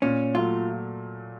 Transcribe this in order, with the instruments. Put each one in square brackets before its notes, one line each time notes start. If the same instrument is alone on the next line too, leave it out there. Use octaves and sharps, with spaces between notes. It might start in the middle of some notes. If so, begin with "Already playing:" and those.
[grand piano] A#2 [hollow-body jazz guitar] C#4
[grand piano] F#3 A3 [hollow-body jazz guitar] F4